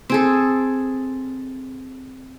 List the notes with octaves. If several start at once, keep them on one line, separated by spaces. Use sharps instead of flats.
C4 G#4 A4